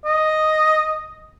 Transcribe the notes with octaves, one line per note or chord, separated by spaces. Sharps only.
D#5